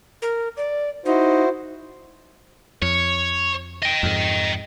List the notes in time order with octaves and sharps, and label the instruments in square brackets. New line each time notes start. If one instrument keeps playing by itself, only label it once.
[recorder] A#4
D5
[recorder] D#4 [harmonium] E4 F#4 C5
[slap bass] F2 [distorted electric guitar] C#5
[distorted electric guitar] D#5 G5
[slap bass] F2 G#2